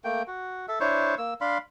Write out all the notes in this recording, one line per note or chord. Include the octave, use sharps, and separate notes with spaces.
A3 A#3 G5
F#4
A4 E5
D4 E4 C5 C#5
A#3 E6
D4 F5 B5 C6